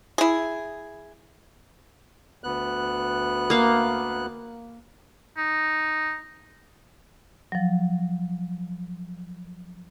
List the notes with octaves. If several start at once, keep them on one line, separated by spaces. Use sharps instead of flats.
E4 G#4
D2 B3 F#6
A#3 F5
D#4
F3 F#3